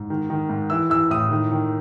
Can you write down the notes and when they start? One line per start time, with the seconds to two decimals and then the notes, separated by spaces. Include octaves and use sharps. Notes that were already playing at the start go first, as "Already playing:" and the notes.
Already playing: G#2
0.10 D#3
0.30 D#3
0.50 G#2
0.70 E3 E6
0.90 E3 E6
1.10 A2 D#6
1.31 D#3
1.52 D#3